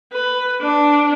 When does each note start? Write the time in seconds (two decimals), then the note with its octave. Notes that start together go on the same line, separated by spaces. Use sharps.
0.13 B4
0.61 D4